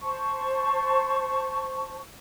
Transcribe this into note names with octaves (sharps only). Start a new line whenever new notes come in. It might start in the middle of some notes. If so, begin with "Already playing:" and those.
C5 A5 C#6